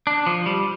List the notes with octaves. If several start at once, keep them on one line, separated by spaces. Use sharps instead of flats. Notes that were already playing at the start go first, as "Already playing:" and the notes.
D4
F3
G3